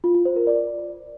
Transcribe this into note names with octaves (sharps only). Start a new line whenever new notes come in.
F4
F4
C5
A#4
D5